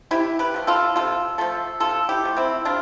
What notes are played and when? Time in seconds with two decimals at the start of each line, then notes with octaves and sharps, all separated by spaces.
0.11 C3 E4 G4
0.39 G4 B4
0.54 F3 A3
0.67 F4 A4
0.96 C3 F4 A4
1.38 F3 A3 F4 A4
1.80 C3 F4 A4
2.09 E4 G4
2.24 F3 A3
2.37 C4 E4
2.65 C3 D4 F4